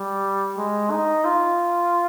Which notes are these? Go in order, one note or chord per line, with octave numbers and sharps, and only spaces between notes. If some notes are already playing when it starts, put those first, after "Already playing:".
Already playing: G3
G#3
D#4
F4